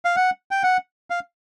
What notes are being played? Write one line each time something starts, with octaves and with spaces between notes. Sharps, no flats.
F5
F#5
G5
F#5
F5